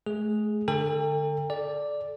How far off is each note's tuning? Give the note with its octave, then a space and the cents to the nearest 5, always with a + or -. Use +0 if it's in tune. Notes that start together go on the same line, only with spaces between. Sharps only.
A3 -45 G#4 +0
D3 +0 A4 +40 G5 +35
A4 -25 D5 +0